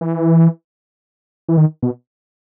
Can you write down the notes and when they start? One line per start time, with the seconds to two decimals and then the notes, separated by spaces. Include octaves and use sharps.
0.01 E3
1.49 E3
1.57 D#3
1.83 B2